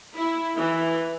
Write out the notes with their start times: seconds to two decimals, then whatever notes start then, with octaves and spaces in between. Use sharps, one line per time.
0.16 E4
0.58 E3